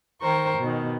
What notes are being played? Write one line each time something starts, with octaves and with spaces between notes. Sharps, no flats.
D#3 A#4 C5 G5 C#6
B2 D#3